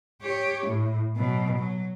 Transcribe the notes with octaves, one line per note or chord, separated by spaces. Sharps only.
G4 C#5
A2
B2 F#3
F#3